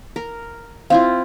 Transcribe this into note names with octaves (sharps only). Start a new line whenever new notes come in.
A#4
C4 E4 F4 F5